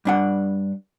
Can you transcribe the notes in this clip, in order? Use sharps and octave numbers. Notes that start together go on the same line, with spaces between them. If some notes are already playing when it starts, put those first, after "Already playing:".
G2 D4 F#5